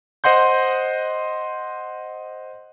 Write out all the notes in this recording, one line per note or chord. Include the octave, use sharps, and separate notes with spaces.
C5 D#5 F#5 C6 G6